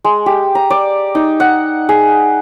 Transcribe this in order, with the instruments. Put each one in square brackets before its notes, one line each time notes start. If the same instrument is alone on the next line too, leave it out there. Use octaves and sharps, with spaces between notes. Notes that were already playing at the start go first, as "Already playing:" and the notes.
[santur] G#3
G4
A#5
D5
D#4
F#5
G#4